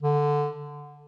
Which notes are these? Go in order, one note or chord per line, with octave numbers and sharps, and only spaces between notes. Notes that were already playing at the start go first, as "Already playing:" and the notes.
D3